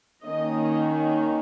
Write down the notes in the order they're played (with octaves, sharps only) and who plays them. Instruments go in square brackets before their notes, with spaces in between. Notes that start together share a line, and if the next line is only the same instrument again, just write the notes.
[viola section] D#3 A#3 C#4 D#5